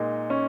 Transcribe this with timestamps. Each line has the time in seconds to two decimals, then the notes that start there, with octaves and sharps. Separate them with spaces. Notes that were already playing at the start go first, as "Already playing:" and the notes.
Already playing: A#2 G#3 D#4
0.30 C#4